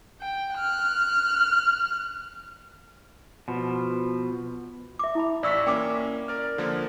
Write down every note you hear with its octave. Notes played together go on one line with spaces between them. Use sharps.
G5
F6 F#6
B2 F3
E5 D6
E4 A5 B5
A1 D5 C#6 E6 B6
A#3 C#4 E4 G5 D6
A#4 D5 F6
D3 F3 A#3